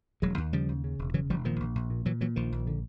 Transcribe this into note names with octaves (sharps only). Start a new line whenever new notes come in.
E1 F#3 G#3
D#2
C#3 F3 G3
D#2
C#3
E1
C#3 E3 F#3
E1 F3 G3
A#2 D#3 F3
A#1
A#1
A#2
A#2 E3 F#3
A#2 E3 F#3
A#1 D#3 F3
A#1
D3